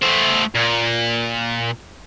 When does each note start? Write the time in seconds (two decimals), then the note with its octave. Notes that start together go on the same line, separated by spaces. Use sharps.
0.02 A3 C5
0.55 A#2